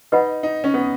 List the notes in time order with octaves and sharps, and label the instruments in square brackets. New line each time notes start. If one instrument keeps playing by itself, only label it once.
[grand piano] D#4 [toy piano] B4 D#5 F#5 B5
[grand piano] D#4
C#4
B3